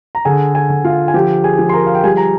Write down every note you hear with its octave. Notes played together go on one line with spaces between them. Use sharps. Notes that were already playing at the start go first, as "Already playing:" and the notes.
A#5
D3 G#4 G#5
G#4 G#5
D3
F4 F5
G#5
F3 G4 G5
G#4 G#5
F3
C6
A#4 A#5
F5
G5
G3 G#4 G#5
A#5